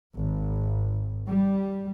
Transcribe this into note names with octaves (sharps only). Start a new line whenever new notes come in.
G#1
G3